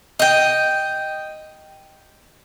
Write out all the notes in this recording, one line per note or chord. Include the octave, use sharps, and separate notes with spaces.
D#5 G5